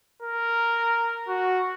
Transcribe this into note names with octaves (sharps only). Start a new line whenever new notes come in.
A#4
F#4